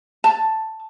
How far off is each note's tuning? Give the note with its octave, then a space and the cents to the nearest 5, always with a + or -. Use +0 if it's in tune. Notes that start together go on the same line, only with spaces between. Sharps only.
A5 +5